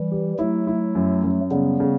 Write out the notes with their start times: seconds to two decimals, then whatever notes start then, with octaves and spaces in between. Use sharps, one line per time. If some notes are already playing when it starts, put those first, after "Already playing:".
Already playing: E3 G3
0.12 G4
0.39 F#3 A3 E4
0.67 E4
0.95 F#2
1.24 F#2
1.51 C#3 G3 B3
1.80 C#3